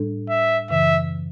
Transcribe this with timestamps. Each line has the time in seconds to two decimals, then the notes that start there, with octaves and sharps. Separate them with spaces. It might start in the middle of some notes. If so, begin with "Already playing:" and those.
Already playing: A2 G3 D4 A4
0.29 E5
0.70 F#2 C#3 E3 E5